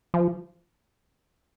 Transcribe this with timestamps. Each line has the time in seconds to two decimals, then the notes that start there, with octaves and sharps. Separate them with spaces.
0.14 F3